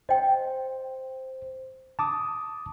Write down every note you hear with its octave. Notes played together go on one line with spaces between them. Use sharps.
C5 D#5 G5
A5 D6 D#6